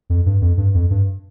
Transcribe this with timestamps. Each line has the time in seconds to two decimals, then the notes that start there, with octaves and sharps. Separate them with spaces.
0.10 F2
0.26 G2
0.42 F2
0.57 G2
0.75 F2
0.90 G2